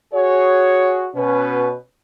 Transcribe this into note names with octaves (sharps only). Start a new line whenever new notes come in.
F#4 G#4 C#5
B2 C#4 B4